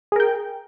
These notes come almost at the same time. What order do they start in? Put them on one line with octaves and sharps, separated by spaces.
G#4 A#4 G5